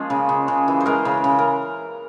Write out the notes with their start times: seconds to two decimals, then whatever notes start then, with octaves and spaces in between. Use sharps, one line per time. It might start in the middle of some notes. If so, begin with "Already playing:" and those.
Already playing: F3 G#3 A#3 C#4 G#4
0.10 C#3
0.29 C#3
0.48 C#3
0.68 E3
0.80 C5
0.86 G#3 A#4
1.05 C#3
1.24 C#3
1.38 A#4